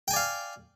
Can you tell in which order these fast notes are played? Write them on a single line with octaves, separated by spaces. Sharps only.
G5 G#5 D5 F5